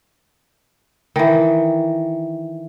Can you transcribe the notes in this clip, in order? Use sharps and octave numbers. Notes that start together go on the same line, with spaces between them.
D#3 E3